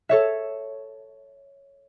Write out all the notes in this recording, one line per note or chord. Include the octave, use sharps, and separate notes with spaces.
A4 C#5 E5